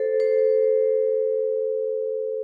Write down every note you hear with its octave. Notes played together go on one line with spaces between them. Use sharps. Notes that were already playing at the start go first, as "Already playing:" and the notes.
Already playing: A4 C5
C5